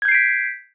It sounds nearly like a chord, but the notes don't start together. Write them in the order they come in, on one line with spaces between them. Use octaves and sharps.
G#6 G6 C7 D7 B6